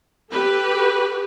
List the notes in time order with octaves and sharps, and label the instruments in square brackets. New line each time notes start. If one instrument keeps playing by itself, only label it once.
[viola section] G4 A4 B4